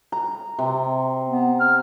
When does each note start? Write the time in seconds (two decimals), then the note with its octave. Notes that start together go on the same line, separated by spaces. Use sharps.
0.12 A#5
0.59 C3
1.27 B3
1.60 F6